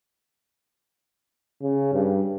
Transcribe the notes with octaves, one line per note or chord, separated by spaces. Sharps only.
C#3
G2